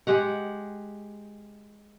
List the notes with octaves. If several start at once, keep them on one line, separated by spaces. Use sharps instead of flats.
G#3 G4 F#5